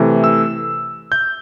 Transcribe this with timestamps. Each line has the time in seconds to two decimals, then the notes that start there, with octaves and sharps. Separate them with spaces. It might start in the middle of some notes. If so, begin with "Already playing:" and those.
Already playing: C3 E3 A3
0.24 E6
1.12 G6